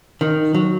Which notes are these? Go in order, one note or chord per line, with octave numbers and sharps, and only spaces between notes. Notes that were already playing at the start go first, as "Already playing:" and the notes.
D#3
F#3